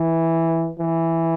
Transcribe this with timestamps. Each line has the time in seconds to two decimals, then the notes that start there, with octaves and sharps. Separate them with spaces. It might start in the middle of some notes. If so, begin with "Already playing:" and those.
Already playing: E3
0.79 E3